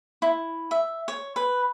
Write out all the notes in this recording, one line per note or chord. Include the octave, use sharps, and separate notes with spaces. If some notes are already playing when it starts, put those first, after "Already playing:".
E4
E5
C#5
B4